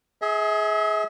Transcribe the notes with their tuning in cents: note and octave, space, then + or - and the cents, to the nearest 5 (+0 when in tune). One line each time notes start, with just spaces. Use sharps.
G#4 +15 E5 -40